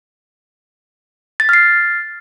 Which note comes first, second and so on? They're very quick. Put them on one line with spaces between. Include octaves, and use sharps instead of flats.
A6 B6 F6 C7